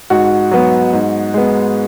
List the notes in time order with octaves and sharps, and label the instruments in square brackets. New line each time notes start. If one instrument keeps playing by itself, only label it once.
[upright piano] G#2 F#4
F#3 B3
G#2
G#3 B3